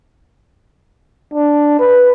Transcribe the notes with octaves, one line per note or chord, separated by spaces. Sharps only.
D4
B4